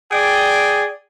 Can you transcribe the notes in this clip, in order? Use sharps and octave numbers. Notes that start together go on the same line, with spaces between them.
G#4 D5 G5